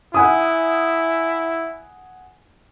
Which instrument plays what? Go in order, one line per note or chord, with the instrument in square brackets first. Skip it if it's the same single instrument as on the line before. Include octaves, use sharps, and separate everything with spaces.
[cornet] E4 [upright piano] F#5 G#5 D#6